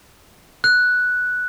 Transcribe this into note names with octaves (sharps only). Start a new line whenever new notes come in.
F#6